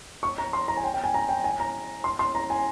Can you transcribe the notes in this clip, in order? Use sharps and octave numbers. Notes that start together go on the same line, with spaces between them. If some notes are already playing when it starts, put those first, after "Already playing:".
C#6
A#5
C6
A#5
G#5
G5
G5
G#5
A#5
G5
G#5
A#5
C6
C6
A#5
G#5